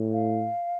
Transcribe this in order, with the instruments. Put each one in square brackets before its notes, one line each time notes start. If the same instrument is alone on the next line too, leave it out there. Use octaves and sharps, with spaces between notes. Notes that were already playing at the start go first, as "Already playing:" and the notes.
Already playing: [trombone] A2
[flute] F5